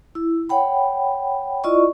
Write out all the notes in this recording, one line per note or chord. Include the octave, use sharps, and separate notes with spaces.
E4
C#5 F#5 G5 B5
E4 F4 D5 D#5 C#6